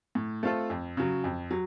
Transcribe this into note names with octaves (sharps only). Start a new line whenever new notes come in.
A2
A3 C4 F4 A4
F2
C#3 F#3
F2
F#3